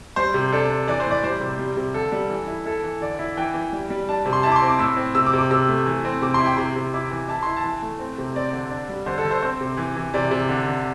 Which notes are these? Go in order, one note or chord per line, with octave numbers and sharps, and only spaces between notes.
G3 C5
C3
D4 A4
D4
E3 D5
C5
A2 D5
G3 C5
C3
G3
C3
D3 A4
G3
E3
E4
E4 A4
E3
D3 D5
E4
E3 G5
E3
G3
G3
D4 A5
C3
C6
E4 A5
D6
C6
C4
D6
A2 E6
C4
C3 E6
D6
C3
D6
C3 E6
A3
E3
C4
C3 D6
C6
E4
G5
C3 C6
C3
E4 D6
E3
E4 A5
E4 C6
A5
E3
A3
C4
C3
C4 D5
D3
D4
G3
D3 C5
A4
D3
C5
C4 C5
C3
E3
E3
C3 D5
C3
D3
D3